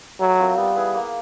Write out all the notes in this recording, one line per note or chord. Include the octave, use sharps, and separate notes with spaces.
F#3 A3
C4 F4 A#4
G3 B3
E4 G#4 B4
A#3